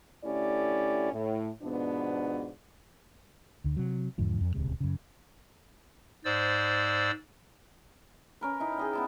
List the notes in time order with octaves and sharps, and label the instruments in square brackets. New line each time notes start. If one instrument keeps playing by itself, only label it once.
[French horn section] D3 A3 C#4 E4 G4 D5
A2
G#2 B2 F3 B3 D4
[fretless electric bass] D2 D3
C3 F#3
E2 G#2 D3 F3
F2
D#1 C#2 C3 G#3
F#2 C#3
[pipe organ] G#2 C5 D5 E6
[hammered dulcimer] C#4 A#4 B4
D#4 E4
G#4 D#5 G5
B3 E4 A5